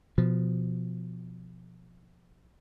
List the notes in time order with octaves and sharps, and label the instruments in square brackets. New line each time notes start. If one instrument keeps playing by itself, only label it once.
[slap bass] B2 F3